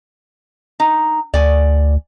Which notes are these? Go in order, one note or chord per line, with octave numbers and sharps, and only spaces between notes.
D#4
D2 D5 G#5